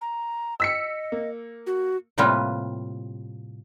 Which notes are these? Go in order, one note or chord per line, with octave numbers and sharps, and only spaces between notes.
A#5
D#5 E6 B6 C#7
A#3
F#4
A2 C3 G3 A#3 F4 B4